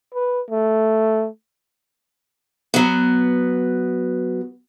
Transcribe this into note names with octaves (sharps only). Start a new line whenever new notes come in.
B4
A3
F#3 B3